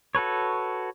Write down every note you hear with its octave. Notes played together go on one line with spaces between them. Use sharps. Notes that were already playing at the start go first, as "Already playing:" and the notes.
F#4 A4 B4 C#5